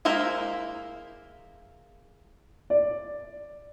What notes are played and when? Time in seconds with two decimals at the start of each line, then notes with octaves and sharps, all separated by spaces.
0.05 G#3 A#3 E4 A#4 C5
2.70 D5